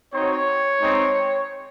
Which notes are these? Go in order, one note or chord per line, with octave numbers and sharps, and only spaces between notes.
C4 D#4 F#4 C#5
G#3 C4 D#4